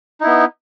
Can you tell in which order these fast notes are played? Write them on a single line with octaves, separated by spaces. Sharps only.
D#4 E4 B3